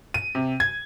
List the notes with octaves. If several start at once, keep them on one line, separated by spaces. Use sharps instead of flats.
D#7
C3
G#6